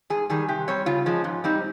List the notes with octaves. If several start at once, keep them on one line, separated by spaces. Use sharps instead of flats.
G#2 G#4
D#3 G3 G#4
C3 G4
G3 C4 C#5
C#3 F4
F3 G#3 C#4
G#2
G3 C4 D#4